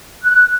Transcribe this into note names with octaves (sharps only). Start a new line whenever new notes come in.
F#6